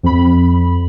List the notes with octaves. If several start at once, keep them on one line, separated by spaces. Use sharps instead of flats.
F2 B5